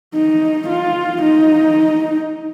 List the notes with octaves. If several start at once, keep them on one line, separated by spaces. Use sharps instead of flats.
D#4
F4
D#4